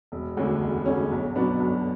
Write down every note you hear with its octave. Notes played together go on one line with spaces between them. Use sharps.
E1
D2 D3 G#3 C#4
E1
D2 D3 G#3 C#4
B1
B2 F#3 B3 D4
B1